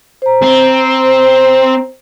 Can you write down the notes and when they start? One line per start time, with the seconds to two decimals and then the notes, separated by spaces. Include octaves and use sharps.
0.22 C5 A#5
0.42 C4